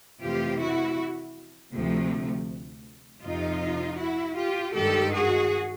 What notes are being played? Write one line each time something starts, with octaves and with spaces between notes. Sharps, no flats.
F2 C3 E3 A3 F4 G4
E4 F#4
D2 C3 F3 A3
F2 C3 F3 D#4 F4
E4 F#4
F4 G4
G2 D#3 G#3 G4 A4
F#4 G#4